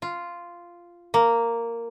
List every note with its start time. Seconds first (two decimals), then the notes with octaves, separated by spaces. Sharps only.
0.02 F4
1.14 A#3